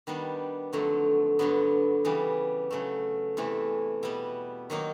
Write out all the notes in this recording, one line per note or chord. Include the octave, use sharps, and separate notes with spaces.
D#3 G3 B3 D4
F2 D3 F#3 A3
G2 D3 F#3 B3
C#3 E3 G3 B3
C#3 F#3 A3
E2 C3 E3 A3
B2 G3 B3
D#3 F#3 A#3 D#4